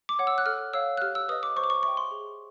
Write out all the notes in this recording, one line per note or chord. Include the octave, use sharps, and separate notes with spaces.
D6
C#5 F#5
E6
F#6
A4 F6
C#5 F5 E6
F#6
G4 F6
E6
B4 D#5 D#6
D6
C5 C#6
D6
C#6
E5 G5 C#6
C6
G#4